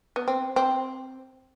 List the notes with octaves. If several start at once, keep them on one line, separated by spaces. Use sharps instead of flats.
B3
C4
C4